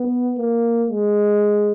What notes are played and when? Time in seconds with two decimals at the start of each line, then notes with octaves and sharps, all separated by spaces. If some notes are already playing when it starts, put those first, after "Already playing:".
Already playing: B3
0.38 A#3
0.89 G#3